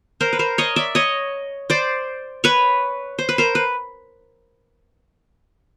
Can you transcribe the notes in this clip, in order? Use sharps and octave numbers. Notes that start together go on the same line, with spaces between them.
A#4 C5
B4
A#4 C5
C#5 D#5
D5 E5
C#5 D#5
C5 D5
B4 C#5
C5
B4
A#4 C5
B4